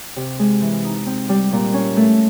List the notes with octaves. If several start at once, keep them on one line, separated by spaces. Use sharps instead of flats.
C3
G#3
E3
D#4
C4
G3
A#2
C#4
A3